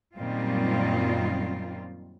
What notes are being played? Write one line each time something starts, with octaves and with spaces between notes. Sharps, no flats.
F#2 A#2 D#3 G3 C4 F4